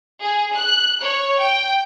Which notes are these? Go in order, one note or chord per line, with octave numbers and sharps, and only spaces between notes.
G#4
F#6
C#5
G5